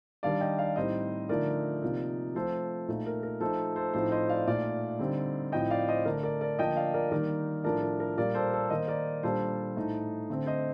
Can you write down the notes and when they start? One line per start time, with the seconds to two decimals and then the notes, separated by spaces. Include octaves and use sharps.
0.23 D#3 G3 D4 D5 F5
0.41 D#5 G5
0.59 D5 F5
0.76 A2 G3 C4 D#4 C5 D#5
1.29 D3 F3 A3 D#4 A#4 D5
1.82 C3 F3 A#3 D#4
2.35 F3 A3 C4 A4 C5
2.88 A#2 A3 D#4
3.06 A#4
3.23 A#4
3.40 F3 A3 D#4 A4 C5
3.76 A4 C5
3.93 A2 F3 C4 D#4 A4 C5
4.12 C5 D#5
4.29 D5 F5
4.47 A#2 A3 D#4 D5 F5
4.99 D3 G3 C4 D#4
5.52 A2 F3 C4 D#4 D#5 G5
5.70 D5 F5
5.88 C5 D#5
6.05 D3 A3 D4 A#4 D5
6.23 A#4 D5
6.41 A#4 D5
6.59 D3 F3 A#3 D4 D#5 G5
6.77 D5 F5
6.94 A#4 D5
7.12 D#3 G3 A#3 D#4 A#4 D5
7.64 A2 F3 A3 D4 A#4 D5
7.82 A#4
8.00 A#4
8.17 A#2 G3 A#3 A#4 D5
8.35 A4 C5
8.53 A4
8.70 D#3 A#3 D#4 C5 D#5
8.88 A#4 D5
9.23 A#2 G3 D4 A4 C5
9.76 A2 A3 D#4
10.30 D3 A3 C4
10.46 C5 D#5